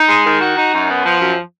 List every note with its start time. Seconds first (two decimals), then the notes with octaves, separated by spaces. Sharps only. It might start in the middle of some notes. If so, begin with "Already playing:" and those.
Already playing: D#4
0.08 G#3
0.25 D#3
0.41 F#4
0.57 D#4
0.73 F#2
0.89 B3
1.05 F3
1.21 F#2